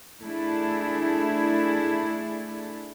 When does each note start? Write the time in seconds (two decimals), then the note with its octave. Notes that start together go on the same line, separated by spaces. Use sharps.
0.22 A3 D4 E4 G#4